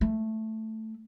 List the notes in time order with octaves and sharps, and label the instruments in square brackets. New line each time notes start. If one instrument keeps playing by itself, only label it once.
[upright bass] A3